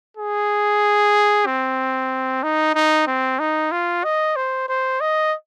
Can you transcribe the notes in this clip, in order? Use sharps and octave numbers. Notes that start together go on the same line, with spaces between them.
G#4
C4
D#4
D#4
C4
D#4
F4
D#5
C5
C5
D#5